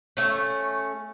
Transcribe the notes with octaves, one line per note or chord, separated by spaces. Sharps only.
A3 C#4